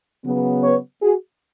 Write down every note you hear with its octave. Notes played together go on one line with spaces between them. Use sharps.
C#3 F#3 B3
B4 C#5
F#4 G#4